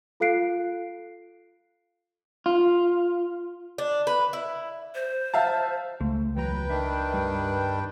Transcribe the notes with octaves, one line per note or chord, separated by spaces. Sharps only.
F4 A4 F5 F#6 C7 D7
F4
D4
B4
E4
C5
E5 F5 A5
C#2 A3
E2 F#3 B4 G5 A#5
D#3 D4 E5
G2 G3